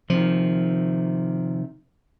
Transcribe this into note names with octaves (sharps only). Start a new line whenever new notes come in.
C3 D#3 F3